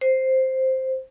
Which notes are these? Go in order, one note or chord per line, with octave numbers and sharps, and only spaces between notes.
C5